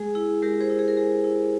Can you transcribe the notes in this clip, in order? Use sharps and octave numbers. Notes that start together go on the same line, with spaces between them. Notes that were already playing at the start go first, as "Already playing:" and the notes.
Already playing: G#3 G#4
E4 G#4
G#3 G4 A#4
G#4 C5
E4
G#4
A#4
G#3 G#4
E4